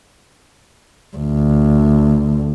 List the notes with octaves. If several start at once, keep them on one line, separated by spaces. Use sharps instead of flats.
D2